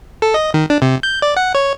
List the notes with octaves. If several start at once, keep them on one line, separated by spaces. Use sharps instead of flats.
A4
D#5
D#3
D4
C3
G6
D5
F#5
C#5